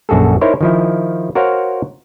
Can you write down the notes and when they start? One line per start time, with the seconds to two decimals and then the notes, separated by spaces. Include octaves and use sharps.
0.09 A#1 F#2 F#4 G#4 A4
0.41 D#4 E4 A#4 C5 C#5
0.61 D#3 F3 E4
1.35 F#4 A#4 C5 C#5 F5 F#5